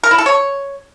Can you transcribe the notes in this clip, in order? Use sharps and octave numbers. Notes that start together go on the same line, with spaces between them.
A#4
E4
A4
C#5